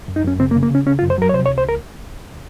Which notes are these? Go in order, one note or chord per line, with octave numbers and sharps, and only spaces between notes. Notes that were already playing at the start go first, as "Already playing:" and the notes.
F#2
D#4
F#2 C#4
C#3 C4
A#3
C#3
A#3
C#3 C#4
C#3 C#4
F4
F#2
C5
F#3 A#4
C#5
C3 C5
C#5
C#2
C5
C#2 A#4